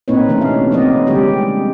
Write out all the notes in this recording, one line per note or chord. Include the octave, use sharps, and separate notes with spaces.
A#2 A#3 C4 D#4 B4 C#5
C3 E3 A3 C#4 D4
F5
F3 B3 C4 D#4 D5 D#5
D3 G3 G#3 G4 C#5